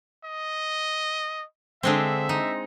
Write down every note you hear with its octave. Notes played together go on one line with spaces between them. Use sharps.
D#5
D3 G#3 C4 E5
D#4